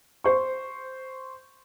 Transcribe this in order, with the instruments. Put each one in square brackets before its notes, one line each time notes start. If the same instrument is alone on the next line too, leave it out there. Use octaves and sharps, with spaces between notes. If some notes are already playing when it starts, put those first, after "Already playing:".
[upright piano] C5 C#6